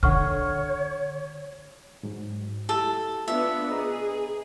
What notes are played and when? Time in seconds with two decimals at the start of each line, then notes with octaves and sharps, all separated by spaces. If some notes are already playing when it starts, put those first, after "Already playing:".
0.03 D3 C#5 F#5 C#6 F6
2.03 G#2 F#3
2.69 E4 G4 A4
3.28 B3 D4 F4 B4 E5
3.71 G#4 B4 D#5 A#5